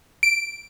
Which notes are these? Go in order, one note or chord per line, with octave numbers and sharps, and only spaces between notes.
D7